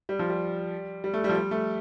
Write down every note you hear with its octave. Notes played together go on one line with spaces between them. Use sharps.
G3
F3
G3
G3
A3
G3
F3
G3
A3